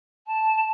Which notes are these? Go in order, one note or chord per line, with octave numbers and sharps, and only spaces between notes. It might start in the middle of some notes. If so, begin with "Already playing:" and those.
A5